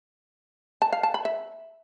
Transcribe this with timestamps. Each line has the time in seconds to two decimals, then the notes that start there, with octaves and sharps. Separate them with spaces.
0.82 A5
0.93 F5
1.03 A5
1.14 B5
1.25 E5